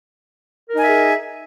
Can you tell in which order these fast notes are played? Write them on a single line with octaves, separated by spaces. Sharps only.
A#4 D#4 G#5 E5 G#4